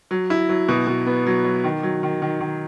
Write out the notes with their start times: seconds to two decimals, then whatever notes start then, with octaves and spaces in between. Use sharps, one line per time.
0.11 F#3
0.30 E4
0.49 F#3
0.69 B2
0.87 B2
1.07 B3
1.26 F#3
1.44 F#3
1.64 D#3
1.83 F#3
2.03 D#3
2.22 D#3
2.40 D#3